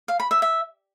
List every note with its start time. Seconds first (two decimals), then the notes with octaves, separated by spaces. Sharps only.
0.08 F5
0.20 B5
0.31 E5
0.42 E5